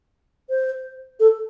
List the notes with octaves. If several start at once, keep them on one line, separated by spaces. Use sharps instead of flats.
C5
A4